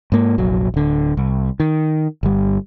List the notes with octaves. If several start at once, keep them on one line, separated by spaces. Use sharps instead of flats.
G#2 A#3
F1 A#1 F#3
D1 D3
C2
D#3
G1 G3